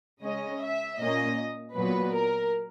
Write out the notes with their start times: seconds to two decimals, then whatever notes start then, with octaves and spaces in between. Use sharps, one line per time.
0.22 C#3 G#3 C#4 D#5
0.61 E5
1.00 A#2 A#3 C#4 D#5
1.76 A#2 F#3 B3 B4
2.14 A#4